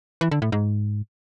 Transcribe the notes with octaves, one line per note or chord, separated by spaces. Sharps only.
E3
D3
A2
G#2